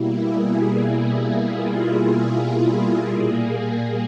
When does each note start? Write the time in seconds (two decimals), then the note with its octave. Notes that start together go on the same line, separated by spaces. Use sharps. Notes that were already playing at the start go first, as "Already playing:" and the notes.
Already playing: B2 G3 A#3 E4
0.21 G#4
1.43 F4
3.05 A#2 G3 A#3 G#4